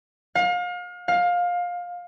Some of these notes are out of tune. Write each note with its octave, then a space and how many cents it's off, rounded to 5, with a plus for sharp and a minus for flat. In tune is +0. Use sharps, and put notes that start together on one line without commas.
F5 +35
F5 +20